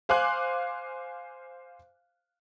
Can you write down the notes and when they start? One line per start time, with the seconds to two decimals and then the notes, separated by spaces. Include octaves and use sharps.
0.09 C5 F5 G#5 D6 F#6